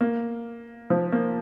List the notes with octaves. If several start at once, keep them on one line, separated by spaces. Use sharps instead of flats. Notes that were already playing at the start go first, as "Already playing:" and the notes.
A#3
F3
A#3